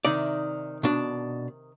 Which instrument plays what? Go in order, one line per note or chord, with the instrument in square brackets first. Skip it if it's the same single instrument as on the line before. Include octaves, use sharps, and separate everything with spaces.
[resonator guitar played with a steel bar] C3 D#3 D#4 [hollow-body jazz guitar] D5
[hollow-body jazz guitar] B2 D4